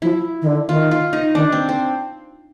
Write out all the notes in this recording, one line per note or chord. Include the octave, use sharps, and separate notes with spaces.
F3 E4
D#3
D3
D#3 F4
F4
D#4
D#3 D4
C4
C4